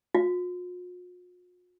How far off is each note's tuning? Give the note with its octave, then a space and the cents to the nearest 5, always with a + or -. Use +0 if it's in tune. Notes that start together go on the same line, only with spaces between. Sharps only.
F4 +45